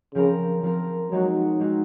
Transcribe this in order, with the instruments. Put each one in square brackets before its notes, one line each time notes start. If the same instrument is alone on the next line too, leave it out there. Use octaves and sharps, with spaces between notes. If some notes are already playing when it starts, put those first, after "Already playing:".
[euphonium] C#3 [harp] F3 C4 F4 A#4
[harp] F3 C4 F4 A#4
[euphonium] F#3 [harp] G#3 C4 D#4 F#4
[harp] G#3 C4 D#4 F#4